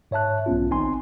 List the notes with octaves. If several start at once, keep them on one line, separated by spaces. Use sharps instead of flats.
G#2 C#5 E5 A5 F#6
B1 B3 C#4 F4
G#1 C4 D#4 G#5 C6